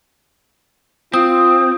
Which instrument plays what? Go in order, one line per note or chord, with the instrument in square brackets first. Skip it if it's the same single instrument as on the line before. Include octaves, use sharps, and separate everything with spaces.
[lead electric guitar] C4 [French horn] F4 [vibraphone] D#6